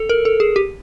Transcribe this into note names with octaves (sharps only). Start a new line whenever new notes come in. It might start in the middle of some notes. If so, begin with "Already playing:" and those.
Already playing: A4
A#4
A4
G#4
G4